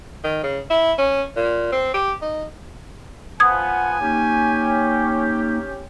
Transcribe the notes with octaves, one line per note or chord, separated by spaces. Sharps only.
D#3
C#3
E4
C#4
A#2
C4
G4
D#4
F3 B3 F#5 G#5 D#6 G#6
A#3 C#4 D#4 G4